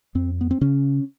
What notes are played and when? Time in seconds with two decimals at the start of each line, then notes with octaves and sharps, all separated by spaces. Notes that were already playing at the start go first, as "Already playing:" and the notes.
0.15 F2 C4
0.41 B3
0.51 C4
0.61 C#3 C#4